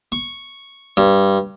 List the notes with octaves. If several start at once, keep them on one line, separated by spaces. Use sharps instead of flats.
C#6
G2